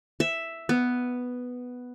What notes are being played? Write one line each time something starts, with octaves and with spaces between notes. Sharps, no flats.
E5
B3